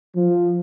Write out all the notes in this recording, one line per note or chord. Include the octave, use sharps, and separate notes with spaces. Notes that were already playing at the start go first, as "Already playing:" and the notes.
F3